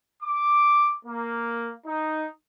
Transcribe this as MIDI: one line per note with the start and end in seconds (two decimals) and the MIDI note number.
0.23 0.97 86
1.06 1.72 58
1.87 2.27 63